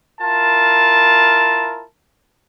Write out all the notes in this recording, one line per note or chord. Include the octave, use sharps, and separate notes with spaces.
E4 F4 A#4 A5